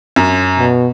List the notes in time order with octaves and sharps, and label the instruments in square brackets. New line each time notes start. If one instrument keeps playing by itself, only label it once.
[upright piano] F#2
[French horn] B2